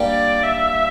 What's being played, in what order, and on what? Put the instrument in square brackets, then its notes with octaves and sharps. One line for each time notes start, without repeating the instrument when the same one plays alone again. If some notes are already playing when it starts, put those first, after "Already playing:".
Already playing: [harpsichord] G3 A#3 D4 G4
[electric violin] D5
E5